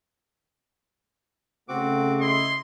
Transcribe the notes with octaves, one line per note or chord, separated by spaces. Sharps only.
C#3 A3 C4 F#4 D6
E4 D#5 C6